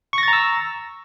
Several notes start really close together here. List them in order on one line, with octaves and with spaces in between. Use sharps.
C#6 A#6 A6 A#5 E6